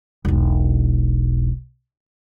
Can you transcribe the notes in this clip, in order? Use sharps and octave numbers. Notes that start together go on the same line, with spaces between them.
E1 B1